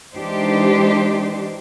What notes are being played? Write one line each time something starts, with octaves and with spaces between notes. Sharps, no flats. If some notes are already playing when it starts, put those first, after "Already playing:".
E3 G#3 D4 D#4 G4 C5